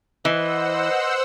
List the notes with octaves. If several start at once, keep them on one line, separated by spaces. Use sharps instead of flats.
E3 C5 D#5 F#5 E6